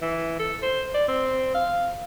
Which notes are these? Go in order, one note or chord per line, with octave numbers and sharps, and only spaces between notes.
E3
A4
C5
D5
C4
F5